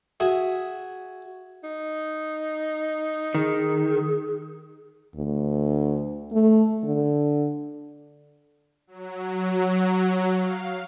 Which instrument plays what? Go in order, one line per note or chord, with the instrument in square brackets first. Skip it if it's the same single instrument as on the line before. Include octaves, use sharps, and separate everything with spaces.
[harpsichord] F#4 G#4 E5
[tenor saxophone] D#4
[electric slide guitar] D#3 [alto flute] G#4
[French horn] D2
A3
D3
[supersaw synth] F#3
F5